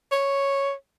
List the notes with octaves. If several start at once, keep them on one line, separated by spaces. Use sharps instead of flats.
C#5